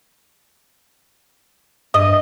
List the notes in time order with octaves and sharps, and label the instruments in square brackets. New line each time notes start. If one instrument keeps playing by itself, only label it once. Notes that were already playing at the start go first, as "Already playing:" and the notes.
[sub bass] G2 [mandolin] D#5